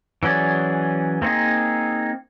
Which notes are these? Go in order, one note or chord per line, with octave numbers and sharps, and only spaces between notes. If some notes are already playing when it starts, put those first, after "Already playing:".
E3 F#3 C#4 G#4 D5
A#3 C4 D#4 G#4